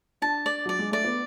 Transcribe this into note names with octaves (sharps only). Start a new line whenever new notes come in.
D4 A5
D5
F#3 D5
G#3
A3 D5
B3